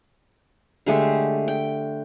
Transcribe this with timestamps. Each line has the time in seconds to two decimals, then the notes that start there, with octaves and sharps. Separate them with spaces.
0.86 D3 G#3 A3 G4
1.48 G5